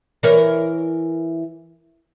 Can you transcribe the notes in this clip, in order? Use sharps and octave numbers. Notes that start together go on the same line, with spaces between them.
E3 A#4 C#5